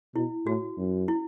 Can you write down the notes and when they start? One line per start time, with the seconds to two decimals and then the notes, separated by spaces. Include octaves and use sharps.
0.15 B2 E4
0.46 A2 F#4
0.78 F#2
1.08 E4